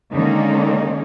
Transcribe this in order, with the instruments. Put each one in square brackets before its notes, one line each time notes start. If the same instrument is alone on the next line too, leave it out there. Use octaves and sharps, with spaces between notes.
[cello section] D3 D#3 G#3 A#3 C#4 D#4